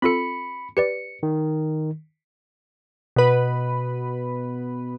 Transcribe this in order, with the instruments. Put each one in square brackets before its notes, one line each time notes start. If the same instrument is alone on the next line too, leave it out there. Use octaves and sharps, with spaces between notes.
[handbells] C4 F4 A4 [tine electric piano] B5 C#7
[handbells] G4 B4 D5 [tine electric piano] C#7
[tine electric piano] D#3
[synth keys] B2 B4